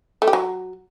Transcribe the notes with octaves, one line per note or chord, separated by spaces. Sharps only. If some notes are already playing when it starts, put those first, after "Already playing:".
A3
G4
F#3